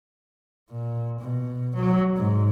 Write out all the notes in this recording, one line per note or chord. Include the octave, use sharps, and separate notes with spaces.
A#2
B2
F#3
G#2